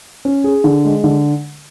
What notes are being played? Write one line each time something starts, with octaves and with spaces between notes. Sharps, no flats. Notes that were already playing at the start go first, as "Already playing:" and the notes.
C#4
G#4
D3
G#3
D3